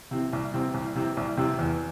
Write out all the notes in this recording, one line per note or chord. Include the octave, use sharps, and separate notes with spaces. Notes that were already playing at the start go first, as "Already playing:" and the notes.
C3 E3 C4
C2
C3 E3 C4
C2
C3 E3 C4
C2
C3 E3 C4
E2